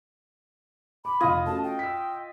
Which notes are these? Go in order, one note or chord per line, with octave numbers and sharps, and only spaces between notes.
B5 D6
F1 F4 D#5 G#6
A3 C#4 F#4 A5
G5
E6 B6